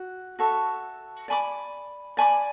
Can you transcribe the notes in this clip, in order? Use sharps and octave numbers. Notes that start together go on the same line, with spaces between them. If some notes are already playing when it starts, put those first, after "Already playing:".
Already playing: F#4
F#4 A4 C#5 E5
D5 G#5 B5 D6
D5 G#5 B5 D6